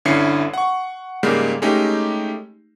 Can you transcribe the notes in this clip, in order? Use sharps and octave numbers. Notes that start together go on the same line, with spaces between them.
G1 D3 C#4 E4 C7 C#7
F#5 C#6
G#2 C#3 G3 G#3 A#3
G#3 A3 C#4 D#4 G4